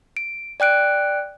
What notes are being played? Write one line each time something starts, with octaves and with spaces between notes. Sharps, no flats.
D7
D5 G5 F#6 D7